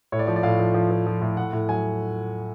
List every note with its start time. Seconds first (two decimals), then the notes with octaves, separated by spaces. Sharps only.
0.12 A2 C#5
0.19 D5
0.26 F3 C#5
0.36 D5
0.43 A2 F5
0.59 F3
0.74 F3
0.91 F3
1.06 F3
1.21 A2
1.37 A2 F#5
1.53 A2
1.69 F#3 G#5